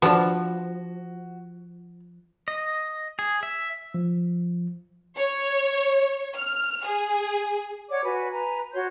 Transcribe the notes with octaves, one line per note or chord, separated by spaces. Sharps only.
F3 D4 F#4 B4
D#5
G#4
E5
F3
C#5
F6
G#4
C#5 D5 F#5 D6
F#4 B4 G#5
B4 G#5 A#5
F#4 C#5 C6 G6